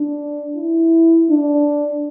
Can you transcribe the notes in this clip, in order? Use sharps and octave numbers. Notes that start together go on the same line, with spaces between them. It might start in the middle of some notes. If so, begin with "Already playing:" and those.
Already playing: D4
E4
D4